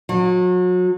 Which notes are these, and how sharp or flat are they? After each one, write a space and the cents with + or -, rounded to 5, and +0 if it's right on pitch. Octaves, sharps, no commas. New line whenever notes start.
F#3 -35